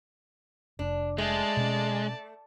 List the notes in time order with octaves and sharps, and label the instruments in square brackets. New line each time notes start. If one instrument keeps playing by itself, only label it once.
[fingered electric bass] F1 [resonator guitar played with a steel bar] D4
[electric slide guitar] G#3 [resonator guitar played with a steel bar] A3 [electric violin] D5 A5
[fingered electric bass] B2 C#4